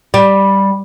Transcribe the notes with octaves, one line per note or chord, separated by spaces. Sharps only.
G3